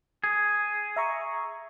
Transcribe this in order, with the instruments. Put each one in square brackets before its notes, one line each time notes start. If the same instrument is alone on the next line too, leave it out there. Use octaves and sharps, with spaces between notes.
[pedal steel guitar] G#4
[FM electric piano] E5 A#5 C#6